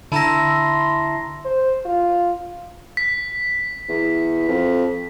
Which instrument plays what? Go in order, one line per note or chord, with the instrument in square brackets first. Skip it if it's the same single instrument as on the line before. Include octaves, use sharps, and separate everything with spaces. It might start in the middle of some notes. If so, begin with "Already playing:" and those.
[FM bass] D3 [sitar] E4 [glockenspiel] A5 A#5 A#6 [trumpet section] C6
[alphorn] C5
F4
[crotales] B6
[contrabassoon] E2
F2